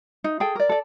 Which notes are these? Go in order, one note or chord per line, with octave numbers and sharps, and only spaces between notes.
D#4
G#4 A4 G5
A#4 D5
A4 D5